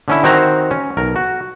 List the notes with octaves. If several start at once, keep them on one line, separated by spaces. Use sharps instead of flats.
D3 C#4 E4
D#3 C4 F#4 C5 E5 A#5
C#4
B1 A#4
F#4